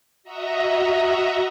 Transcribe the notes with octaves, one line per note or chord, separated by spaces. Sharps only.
F#4 D#5 E5 A#5